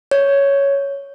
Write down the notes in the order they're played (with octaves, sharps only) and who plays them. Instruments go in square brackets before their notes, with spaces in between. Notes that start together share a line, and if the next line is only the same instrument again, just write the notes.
[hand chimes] C#5